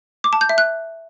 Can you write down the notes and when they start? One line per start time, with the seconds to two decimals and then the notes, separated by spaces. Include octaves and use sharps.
0.24 D6
0.33 A5
0.41 G6
0.49 E5
0.58 F#6